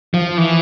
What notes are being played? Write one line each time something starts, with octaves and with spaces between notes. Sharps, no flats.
F3
E3